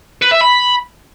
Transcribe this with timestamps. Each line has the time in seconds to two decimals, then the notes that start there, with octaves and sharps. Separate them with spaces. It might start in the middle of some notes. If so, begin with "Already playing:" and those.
0.23 B4
0.32 E5
0.42 B5